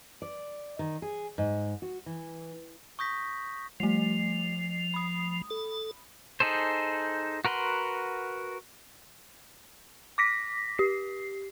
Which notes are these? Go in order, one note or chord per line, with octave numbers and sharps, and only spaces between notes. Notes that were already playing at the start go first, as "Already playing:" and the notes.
D5
D#3
G#4
G#2
F#4
E3
C#6 D#6 G6 A#6 B6
F3 G3 A3
B5 D#6
A4
D#4 G#4 A4 C5
F#4 A#4 B4 F#5 C6
D6 A#6 B6
G4 C7